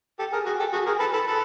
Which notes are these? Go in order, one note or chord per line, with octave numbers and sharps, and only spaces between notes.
G4 A4
G#4 A#4
F#4 G#4
G4 A4
F#4 G#4
G#4 A#4
A4 B4
A4 B4
A4 B4